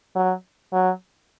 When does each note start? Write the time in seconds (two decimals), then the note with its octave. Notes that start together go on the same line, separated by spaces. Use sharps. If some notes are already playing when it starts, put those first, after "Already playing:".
0.15 F#3
0.73 F#3